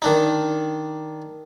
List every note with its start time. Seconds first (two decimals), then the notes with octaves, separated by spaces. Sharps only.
0.02 D#3 D4 D#4